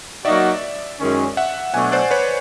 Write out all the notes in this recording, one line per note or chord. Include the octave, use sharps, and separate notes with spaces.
F#3 A#3 D#4 F#4 D5 E5
F#2 D#3 G#3 C#4
E5 F#5
B2 F#3 A3 D4 F#4 F#5 G#5
C5 D5
B4 C#5